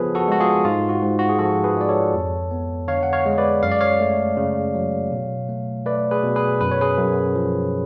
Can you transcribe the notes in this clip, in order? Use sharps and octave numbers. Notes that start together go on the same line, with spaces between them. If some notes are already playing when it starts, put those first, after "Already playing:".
Already playing: C#3 F3 B3 G#4 A4 B4 C#5
F#4 A4
G#3 F#4
F4 G#4
G#2 F4
F#4
G#2
F#4
G#4
F3 F#4 A4
G#4 B4
G#3 D5
A4 C#5
F2
B3
D3 C#5 F5
F#5
C#5 F5
G#3
B4 D5
F#2 F5
D5
C#5 F5
A3
C#3
F#3
B2
A3
A3 B4 D5
G#4 B4
B2
G#4 B4
F#2 B4
C#5
G#4 B4
F#2
F3